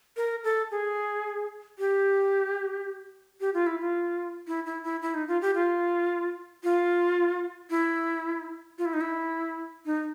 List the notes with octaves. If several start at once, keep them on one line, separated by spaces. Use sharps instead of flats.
A#4
A4
G#4
G4
G4
F4
E4
F4
E4
E4
E4
E4
D#4
F4
G4
F4
F4
E4
F4
E4
D#4
E4
D#4